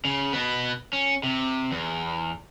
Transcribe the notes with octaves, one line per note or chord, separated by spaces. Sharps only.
C#3
B2 B3
C#4
C3
E2